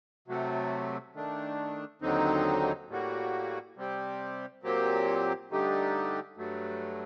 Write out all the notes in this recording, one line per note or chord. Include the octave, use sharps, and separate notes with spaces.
C3 F#3 A3
D#3 A3 D4
D#2 D3 F#3 C4 D#4
A2 G3 A#3 F#4
C3 G3 C4 G4
A#2 F#3 C4 G4
G2 D3 A3 D#4 G4
G2 F#3 A3